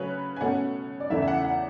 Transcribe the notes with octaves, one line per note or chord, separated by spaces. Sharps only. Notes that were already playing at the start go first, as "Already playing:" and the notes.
Already playing: C#3 F#3 A3 C#4 B4 C#5
G#5
B2 A3 C#4 F#5
D5
E2 C#3 E3 A3 E5
E5
F#5
F#5